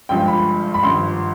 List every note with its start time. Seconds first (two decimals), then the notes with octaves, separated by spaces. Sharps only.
0.09 G1 G2 F3 G#3 G5
0.28 B5
0.74 B5
0.83 G#1 G2 F3 C6